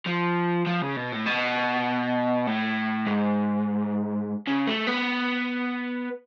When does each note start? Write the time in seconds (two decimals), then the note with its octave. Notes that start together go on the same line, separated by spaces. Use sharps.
0.06 F3
0.67 F3
0.82 C#3
0.96 B2
1.12 A2
1.26 B2
2.47 A2
3.07 G#2
4.48 C#3
4.68 A3
4.87 B3